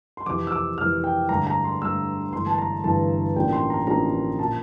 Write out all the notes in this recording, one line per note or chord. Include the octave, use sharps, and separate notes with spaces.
C6
F2 C3 E3 D6
E6
D6
F2 C3 E3 F6
G5
G2 D3 A3 A#5
A#5
C6
G2 D3 A3 E6
G1 G2 E3 A3 C6
A5
A#5
G1 G2 E3 A3 A5
A1 A2 F3 A#3 D4 G5
C6
A#5
A1 A2 F3 A#3 D4 A#5
A#2 F3 A5